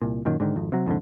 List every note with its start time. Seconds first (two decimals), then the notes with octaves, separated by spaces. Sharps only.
0.01 C2 A#2
0.25 F#2 A#2 D#3 F#3
0.40 G#2 D3 D#3
0.56 G#1 F2
0.72 C3 F#3
0.86 C2 F2 G#2 D3